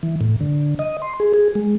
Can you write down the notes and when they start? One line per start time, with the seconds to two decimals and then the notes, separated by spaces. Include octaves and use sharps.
0.03 E3
0.21 A2
0.41 D3
0.79 D#5
1.02 C6
1.20 G#4
1.34 G#4
1.55 G#3